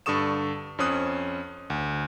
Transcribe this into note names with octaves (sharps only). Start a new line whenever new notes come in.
G2 D3 A4 C#6 D#6 E7
F2 C#4 C5 D#6 F#6
D2